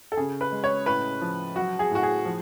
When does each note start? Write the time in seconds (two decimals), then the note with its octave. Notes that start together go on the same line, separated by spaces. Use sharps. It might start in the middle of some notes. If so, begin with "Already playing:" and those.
0.12 A4
0.17 C#3 G#4
0.41 B4
0.52 G#3
0.64 C#5
0.86 A2 B4
1.21 F3
1.56 F#3 F#4
1.79 G#4
1.91 A2 F#4
2.03 G#4
2.25 F3